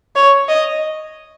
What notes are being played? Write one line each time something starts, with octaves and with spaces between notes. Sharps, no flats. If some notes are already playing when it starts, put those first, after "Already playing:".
C#5
D#5